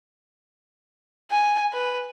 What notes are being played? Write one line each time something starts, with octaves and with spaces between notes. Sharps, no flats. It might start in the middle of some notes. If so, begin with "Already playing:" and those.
G#5
B4